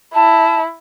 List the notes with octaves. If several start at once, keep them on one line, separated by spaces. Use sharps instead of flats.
E4 A5